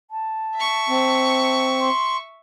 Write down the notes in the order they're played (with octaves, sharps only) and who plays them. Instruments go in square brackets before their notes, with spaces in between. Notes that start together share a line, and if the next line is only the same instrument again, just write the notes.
[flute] A5
[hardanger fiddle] E5 C#6
[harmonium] C4
[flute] C6